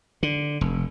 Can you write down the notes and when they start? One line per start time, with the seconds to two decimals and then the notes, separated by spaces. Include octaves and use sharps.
0.23 D3
0.61 F1